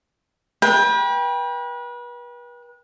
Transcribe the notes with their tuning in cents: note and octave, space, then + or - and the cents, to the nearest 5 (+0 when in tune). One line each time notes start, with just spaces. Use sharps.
B4 -35 G5 +20